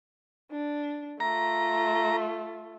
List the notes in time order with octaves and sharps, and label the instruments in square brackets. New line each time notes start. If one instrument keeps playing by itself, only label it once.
[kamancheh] D4
[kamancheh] A3 F4 [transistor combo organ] A#5